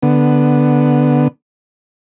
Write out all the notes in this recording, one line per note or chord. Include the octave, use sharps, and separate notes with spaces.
D3 B3